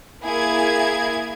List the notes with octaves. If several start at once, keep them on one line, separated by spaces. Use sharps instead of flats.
A#3 E4 G#4 G#6